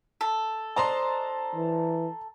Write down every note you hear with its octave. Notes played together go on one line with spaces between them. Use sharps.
A4
D4 C5 D#5 A5 A#5 C6
E3